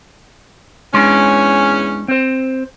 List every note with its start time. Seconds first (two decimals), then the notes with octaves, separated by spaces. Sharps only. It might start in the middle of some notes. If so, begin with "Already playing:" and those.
0.94 E2 G#3 C#4 D4 C6
2.08 C4 C5